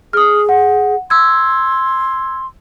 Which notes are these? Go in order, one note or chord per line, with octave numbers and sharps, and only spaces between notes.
G#4 D#6 F6
F#5
C6 E6 G#6